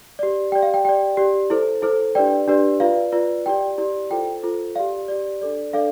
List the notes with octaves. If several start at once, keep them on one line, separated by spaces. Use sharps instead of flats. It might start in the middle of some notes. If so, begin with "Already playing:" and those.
G4 D5
G4 D5 G5
F5
G5
G4 D5 G5
G4 D5
E4 A4 C5
E4 A4 C5
D4 G4 B4 D5 G5
D4 G4 B4 D5
F4 B4 D5 F5
F4 B4 D5
E4 G4 D5 G5
E4 G4 D5
F4 A4 C5 G5
F4 A4 C5
G4 D5 F5
G4 D5
D4 A4 D5
D4 A4 D5 F5